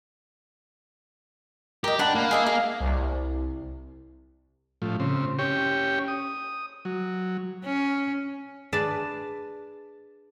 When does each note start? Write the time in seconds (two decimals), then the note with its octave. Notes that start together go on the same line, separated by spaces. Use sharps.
1.84 G4 A#4 D#5
1.99 D4 F#5 B5
2.15 A#3
2.31 G#4 D#5 E5
2.46 G#4
2.80 C2
4.82 A2 F3
5.00 C#3 C4
5.39 C#4 G4 C#5 G5
6.08 D#6
6.85 F#3
7.65 C#4
8.73 D4 G#4 B4 D5 A5